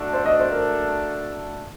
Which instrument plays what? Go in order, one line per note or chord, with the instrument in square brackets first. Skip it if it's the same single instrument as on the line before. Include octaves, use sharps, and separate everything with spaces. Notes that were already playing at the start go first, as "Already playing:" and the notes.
Already playing: [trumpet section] A3 D4 F#4 A4
[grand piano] C5
D#5
C5
A#4